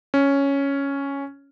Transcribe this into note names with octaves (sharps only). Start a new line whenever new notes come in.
C#4